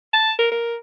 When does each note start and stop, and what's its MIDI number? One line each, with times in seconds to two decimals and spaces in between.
0.14 0.32 81
0.39 0.50 70
0.51 0.76 70